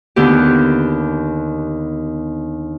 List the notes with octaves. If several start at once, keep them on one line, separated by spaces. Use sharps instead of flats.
D#2 D3 B3 G4